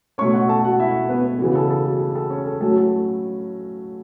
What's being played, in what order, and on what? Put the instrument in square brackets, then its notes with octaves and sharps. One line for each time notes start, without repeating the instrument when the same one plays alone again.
[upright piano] B2 A3 C#4 C#5 C#6
F#4 F#5
A4 A5
F#4 F#5
E4 E5
B3 B4
C#3 E3 B3 F#4
A4
A4
F#4
A4
A4
C#4 C#5
A4
A2 F#3 A3 C#4 A4
F#4
A4